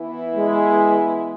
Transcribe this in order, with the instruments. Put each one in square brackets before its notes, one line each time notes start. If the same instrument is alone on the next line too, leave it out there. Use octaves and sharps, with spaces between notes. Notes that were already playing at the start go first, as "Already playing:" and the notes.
Already playing: [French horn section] E3 B3 E4
[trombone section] G#3